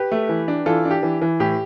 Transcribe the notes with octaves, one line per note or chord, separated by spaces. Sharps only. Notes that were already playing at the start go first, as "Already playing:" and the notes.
Already playing: G4 B4
A3
E3
D4
E3 F4 A4
D4
G4
E3
E3
A2 G4